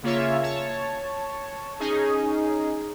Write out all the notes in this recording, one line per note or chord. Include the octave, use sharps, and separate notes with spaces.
C#3 A#3 F4 C#5 E5
C#5 A5
C#4 D#4 G#4